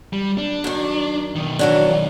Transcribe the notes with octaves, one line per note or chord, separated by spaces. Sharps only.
G3
D4
F#2 D#3
B1 D#3
E3 F#3 D4